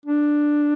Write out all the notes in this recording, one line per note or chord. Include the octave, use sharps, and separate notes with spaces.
D4